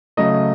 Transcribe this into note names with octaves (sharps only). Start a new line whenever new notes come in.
C#3 F#3 A3 D#5